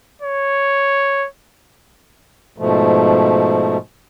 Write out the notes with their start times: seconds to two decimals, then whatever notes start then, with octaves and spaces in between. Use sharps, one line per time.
0.22 C#5
2.58 G#2 B2 F3 A3